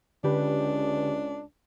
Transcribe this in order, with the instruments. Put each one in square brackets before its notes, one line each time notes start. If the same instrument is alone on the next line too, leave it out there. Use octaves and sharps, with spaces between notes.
[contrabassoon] C#2 [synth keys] D3 G4 B4 [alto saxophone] D4